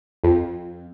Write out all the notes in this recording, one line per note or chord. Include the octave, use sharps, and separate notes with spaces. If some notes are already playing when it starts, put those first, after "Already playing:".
F2